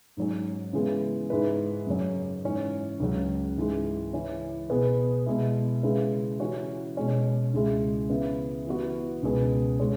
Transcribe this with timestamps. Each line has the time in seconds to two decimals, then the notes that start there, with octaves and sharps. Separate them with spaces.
0.17 G#2 F#3 C#4
0.73 C#3 E3 G#3 B3
1.30 G#2 G#3 E4 B4
1.87 F#2 C#3 F#3 C#4
2.44 G#2 E3 C#4
3.00 C#2 C#3 F#3
3.57 G#2 E3 G#3
4.13 C#3 E3 C#4
4.70 B2 B3 G#4 B4
5.26 B2 G#3 B3 E4
5.83 C#3 G#3 E4 B4
6.40 E3 C#4 F#4
6.97 B2 G#3 C#4
7.54 C#2 C#3 G#3 E4
8.09 C#3 E3 B3 E4
8.66 E3 B3 F#4
9.23 C#2 B2 B3 G#4 B4
9.80 C#3 G#3 C#4